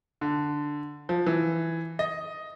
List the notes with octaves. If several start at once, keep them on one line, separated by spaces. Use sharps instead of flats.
D3
F3
E3
D#5